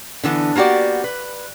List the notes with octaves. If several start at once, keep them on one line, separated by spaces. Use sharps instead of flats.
D3 E3 B3
A#3 B3 F#4 G4 D5
B4